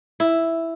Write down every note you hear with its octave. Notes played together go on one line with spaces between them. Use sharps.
E4